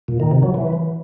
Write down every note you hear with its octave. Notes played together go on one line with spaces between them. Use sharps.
A#2
D#3
C3
F#3
E3